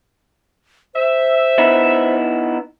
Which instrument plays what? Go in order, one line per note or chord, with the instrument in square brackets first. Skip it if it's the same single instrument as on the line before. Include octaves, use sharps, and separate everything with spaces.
[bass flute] C5 [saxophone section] E5
[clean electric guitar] B3 D#4 E4